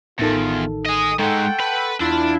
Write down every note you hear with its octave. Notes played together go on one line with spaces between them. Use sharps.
A1 E2 D#3 F4 A4
D#5 G#5 D#6
G#3 D#4 A4 F#5 G5 C6 C#6
B4 B5
E2 D4 E4 F4